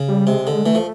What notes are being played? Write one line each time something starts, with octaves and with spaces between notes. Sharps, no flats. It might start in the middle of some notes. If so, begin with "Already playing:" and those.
Already playing: C#3
G3
C3 G#3
D3
E3 A3
F3